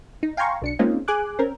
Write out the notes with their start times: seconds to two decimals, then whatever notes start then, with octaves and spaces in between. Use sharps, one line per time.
0.23 D#4
0.37 F5 G5 G#5 A#5 C6 C#6
0.62 B1 D4 C#7
0.79 G#3 A#3 C4 C#4 D#4 F4
1.08 G#4 G#5 D6 F#6
1.39 C4 C#4 A#4